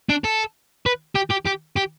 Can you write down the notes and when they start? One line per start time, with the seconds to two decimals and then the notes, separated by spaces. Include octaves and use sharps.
0.10 D4
0.24 A4
0.86 B4
1.16 G4
1.31 G4
1.47 G4
1.77 G4